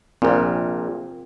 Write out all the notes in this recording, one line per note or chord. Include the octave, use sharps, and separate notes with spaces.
A#1 A#2 C4 F4 A#4